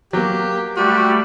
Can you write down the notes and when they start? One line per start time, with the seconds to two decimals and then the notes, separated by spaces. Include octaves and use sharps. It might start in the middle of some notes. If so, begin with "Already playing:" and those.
0.13 F#3 A#3 G4
0.77 G3 A3 F#4 G4